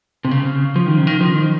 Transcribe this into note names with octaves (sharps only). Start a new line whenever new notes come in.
C3
C#3
F3
D#3
C#3
D#3
F3
D#3